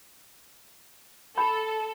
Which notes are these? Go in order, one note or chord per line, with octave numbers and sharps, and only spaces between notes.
A4 B5